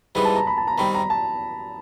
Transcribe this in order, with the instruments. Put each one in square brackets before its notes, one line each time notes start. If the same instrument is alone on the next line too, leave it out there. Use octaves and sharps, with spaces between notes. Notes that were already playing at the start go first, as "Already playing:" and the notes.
[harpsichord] G#2 E3 G3 B3 D#4 [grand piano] B5
[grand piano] A5
A#5
B5
A5
A#5
[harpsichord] D#3 G3 C4 [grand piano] B5
[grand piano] A#5
A5